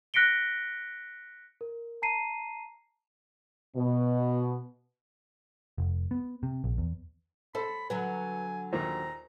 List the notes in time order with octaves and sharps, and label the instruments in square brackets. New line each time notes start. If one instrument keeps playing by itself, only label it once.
[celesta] F#6 A#6 B6 C#7 D7 G7
A#4
A5 A#5 C7 D#7
[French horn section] B2
[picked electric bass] F1
B3
C3
A#1
E2
[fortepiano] A4 [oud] C5 [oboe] B5
[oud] D3 F#3 F#4 [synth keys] B4 [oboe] G#5
[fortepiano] D#2 A#2 [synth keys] C5 [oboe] A#5